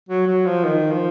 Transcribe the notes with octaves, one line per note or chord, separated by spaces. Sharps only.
F#3
F#3
F3
D#3
F3